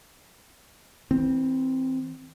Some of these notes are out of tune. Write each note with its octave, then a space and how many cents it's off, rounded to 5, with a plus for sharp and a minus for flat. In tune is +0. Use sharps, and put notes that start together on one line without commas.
E3 -30 C4 +0